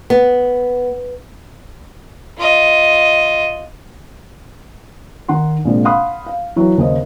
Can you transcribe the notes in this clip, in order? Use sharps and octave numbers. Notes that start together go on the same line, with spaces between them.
B3
F4 D#5
D#3 F#5 A#5 C6
A#1 C3 G#3 A#3
F5 F#5 B5 C6 D#6 F#6
F5
E3 F#3 D#4
D#2 C#3 C5 D#5